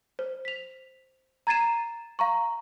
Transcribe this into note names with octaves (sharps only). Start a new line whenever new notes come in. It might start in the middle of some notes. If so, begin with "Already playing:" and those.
C5
B6 F7
A#5 G#6 A6 C7 D#7 E7
F5 A#5 C#6